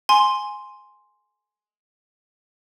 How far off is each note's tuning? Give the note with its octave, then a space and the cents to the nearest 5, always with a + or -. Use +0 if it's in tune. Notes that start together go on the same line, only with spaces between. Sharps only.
G#5 +0 C6 +0